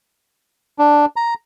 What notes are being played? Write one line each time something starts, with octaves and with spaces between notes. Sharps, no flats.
D4
A#5